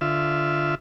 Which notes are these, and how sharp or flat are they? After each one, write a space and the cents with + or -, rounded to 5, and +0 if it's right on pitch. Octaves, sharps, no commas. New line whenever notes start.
D3 +0 F4 -10 E5 +0